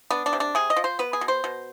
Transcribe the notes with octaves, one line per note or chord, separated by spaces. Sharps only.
B3 D4
D4
C3
D4
C3 G#4
D#5
F3
C5
B3 B4
G#4
B2
C5
B2